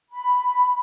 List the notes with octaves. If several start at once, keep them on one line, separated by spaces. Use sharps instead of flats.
B5